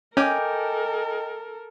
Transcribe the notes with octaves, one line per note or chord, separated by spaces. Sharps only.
C#4 A4 A#4 D#5 G5 G#5 D6 G6